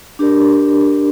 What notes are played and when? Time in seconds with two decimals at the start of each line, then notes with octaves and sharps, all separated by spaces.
0.19 D4 G4 A#4 D5